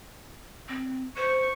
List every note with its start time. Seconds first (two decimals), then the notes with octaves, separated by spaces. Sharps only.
0.68 C4
1.17 C5 C#6